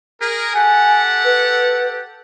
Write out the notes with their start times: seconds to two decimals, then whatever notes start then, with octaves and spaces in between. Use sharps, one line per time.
0.20 G#4 A#4
0.54 G4 A4 F#5 G#5
1.25 B4